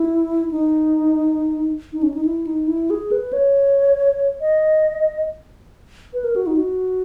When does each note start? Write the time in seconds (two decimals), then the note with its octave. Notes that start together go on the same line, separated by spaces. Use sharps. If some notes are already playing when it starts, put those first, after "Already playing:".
Already playing: E4
0.51 D#4
1.93 D#4
2.03 C#4
2.14 D#4
2.25 E4
2.47 D#4
2.67 E4
2.90 G#4
3.11 B4
3.33 C#5
4.41 D#5
6.13 B4
6.24 A#4
6.36 F#4
6.47 D#4
6.57 F#4